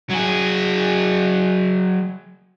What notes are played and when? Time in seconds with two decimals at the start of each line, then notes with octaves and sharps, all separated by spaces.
0.10 F#3 G#4